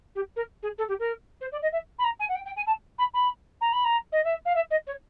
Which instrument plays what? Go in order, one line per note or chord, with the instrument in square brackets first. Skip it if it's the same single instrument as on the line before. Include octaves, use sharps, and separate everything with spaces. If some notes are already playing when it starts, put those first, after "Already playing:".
[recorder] G4
A#4
G#4
A4
G4
A#4
C5
D5
D#5
E5
B5
A#5
G#5
F#5
G5
G5
G#5
A5
B5
B5
A#5
B5
A#5
D#5
E5
F5
E5
D#5
C#5